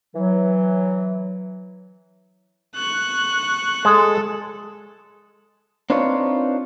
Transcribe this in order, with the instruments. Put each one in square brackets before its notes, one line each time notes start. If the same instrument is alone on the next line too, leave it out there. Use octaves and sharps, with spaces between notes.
[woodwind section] E3 F#3
[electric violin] C#6 F#6
[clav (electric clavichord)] G#3 [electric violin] A4
[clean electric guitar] C4 D4 D#4 F4 B4 C#5